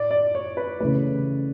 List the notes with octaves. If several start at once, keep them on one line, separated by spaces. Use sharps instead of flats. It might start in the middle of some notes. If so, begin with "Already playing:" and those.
Already playing: A2 D5
D5
C#5
B4
C#3 E3 A3 B4